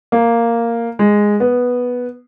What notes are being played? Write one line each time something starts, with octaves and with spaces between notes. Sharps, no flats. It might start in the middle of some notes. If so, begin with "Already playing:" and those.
A#3
G#3
B3